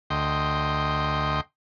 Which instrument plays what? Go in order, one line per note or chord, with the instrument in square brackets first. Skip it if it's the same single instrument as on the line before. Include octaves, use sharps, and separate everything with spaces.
[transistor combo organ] D2 D#5 G5 C6